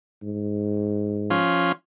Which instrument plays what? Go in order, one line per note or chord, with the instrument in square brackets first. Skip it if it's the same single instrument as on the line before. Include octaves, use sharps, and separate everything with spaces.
[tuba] G#2
[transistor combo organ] F3 C#4 F4